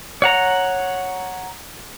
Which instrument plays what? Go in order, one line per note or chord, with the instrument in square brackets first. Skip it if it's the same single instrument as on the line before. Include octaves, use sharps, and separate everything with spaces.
[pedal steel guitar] C#5 F#5 A#5